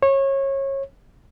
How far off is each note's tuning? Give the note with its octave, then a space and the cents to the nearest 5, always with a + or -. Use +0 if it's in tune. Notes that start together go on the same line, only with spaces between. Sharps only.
C#5 -25